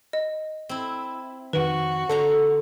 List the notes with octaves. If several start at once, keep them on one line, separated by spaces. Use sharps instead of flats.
D#5
C4 E4
F2 D#3 F#4 B4
D3 A4 C5 A#5